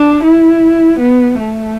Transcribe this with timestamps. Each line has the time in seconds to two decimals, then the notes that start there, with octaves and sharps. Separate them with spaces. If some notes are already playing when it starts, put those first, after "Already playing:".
Already playing: D4
0.24 E4
1.00 B3
1.38 A3